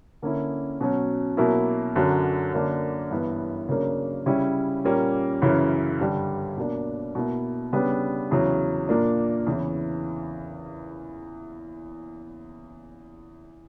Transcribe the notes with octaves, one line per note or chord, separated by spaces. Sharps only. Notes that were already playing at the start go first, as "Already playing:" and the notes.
D3 A#3 C#4 E4
B2 F#3 C#4
B2 F#3 A#3 E4
F#2 D3 F#3
F#2 D3 A#3 D4
G2 E3 B3 E4
C#3 F#3 A#3 D4
C#3 G3 C#4 E4
A#2 G3 A#3 C#4
F#2 C#3 E3
G2 D3 G3
B2 A#3 D4
B2 A#3 E4
C#3 G3 B3 D4
E2 C#3 F#3
A#2 A#3 D4
E2 C#3 E3